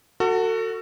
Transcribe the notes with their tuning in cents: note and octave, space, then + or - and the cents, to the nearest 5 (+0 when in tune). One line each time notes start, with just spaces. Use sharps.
F#4 +0 A4 +35